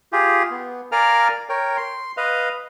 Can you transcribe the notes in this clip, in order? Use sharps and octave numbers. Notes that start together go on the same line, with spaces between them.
F4 G4 G#4
B3
A#4 D5 F5 G#5 A#5 F6
A#4 C#5 G5
C6
B4 D#5 F5